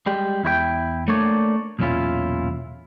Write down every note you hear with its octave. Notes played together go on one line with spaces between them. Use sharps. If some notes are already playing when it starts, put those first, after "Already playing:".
G3 G#3 G4
E2 E4 C5 G5
A3 A#3 D4 C#5 D5
B1 E2 A#2 C#4 E4 F4